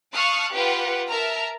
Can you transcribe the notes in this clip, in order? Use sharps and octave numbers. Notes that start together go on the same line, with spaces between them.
F5 A5 C#6 D#6 F6 F#6
F4 G4 B4 F#5 G5
A#4 E5 A5 A#5 F6